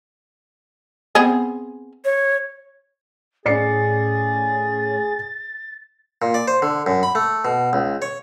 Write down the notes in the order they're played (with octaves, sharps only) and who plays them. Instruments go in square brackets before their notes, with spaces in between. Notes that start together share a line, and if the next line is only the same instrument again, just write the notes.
[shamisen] B3 C4 G#4
[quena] C#5
[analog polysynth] A2 C#4 [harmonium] G#4 [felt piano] D5 C7 C#7 [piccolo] A6
[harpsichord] A#2
D5
C5
D3
F#2
B5
A3
B2
C#2
C#5